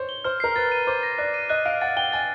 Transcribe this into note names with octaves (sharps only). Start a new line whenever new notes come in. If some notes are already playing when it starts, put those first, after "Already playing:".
Already playing: C5 C#5
G7
C5 F6
A#4 C7
B4 A6
D#7
C5 D6
A#6
D5 F#6
D#7
D#5 F#6
F5 D7
F#5 A6
G5 G7
G#5 A6